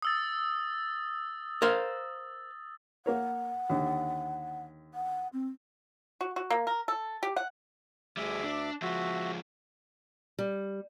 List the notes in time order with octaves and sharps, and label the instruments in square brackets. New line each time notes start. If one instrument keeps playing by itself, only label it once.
[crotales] D#6 E6 A6
[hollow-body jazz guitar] A#4 C5 F5
[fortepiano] A#3 A#4 C#5 [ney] F#5
[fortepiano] D#2 D3
[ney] F#5
C4
[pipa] F#4
F#4
A#3
A#4
A4
G4
F#5
[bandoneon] D2 E5 D6 [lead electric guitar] G3 G#4
[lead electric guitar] D4
[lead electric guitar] F3 G#3 [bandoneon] F#4 E5
[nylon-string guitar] G3